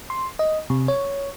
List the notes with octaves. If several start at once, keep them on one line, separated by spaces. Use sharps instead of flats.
C6
D#5
C3
C#5